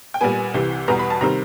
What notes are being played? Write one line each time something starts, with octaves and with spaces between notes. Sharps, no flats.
G5
A#2 G3 B3 G#5
C2 C3 E3
E2 B2 G3 B3 A#5
B5
A5
C3 D#3 G3 C4 A#5